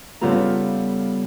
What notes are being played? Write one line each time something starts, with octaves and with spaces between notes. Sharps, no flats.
C#3 G3 B3 F4 A4 A#5